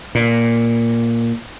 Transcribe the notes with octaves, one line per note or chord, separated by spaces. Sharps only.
A#2